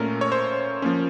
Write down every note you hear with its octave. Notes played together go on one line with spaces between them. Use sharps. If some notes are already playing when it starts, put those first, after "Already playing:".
Already playing: A#2 A3 C#4 A#4
C#5
C5
F3 A#3 C#4